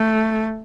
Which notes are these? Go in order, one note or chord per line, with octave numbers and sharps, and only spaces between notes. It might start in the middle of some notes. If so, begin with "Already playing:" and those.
Already playing: A3